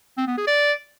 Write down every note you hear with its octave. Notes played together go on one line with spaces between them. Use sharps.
C4
B3
G#4
D5